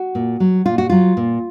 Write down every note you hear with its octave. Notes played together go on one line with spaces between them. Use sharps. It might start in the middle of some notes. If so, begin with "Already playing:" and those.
Already playing: F#4
A#2
F#3
A#2 F4
F#4
F#3 F4
A#2